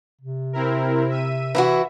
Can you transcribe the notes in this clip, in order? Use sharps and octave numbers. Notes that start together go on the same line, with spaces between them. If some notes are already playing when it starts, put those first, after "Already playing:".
C3
C4 E4 A#4
E5 D#7
E3 E4 F#4 E5